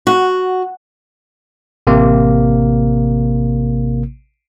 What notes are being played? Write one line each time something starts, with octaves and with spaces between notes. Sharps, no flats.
F#4
A1 C3 A#3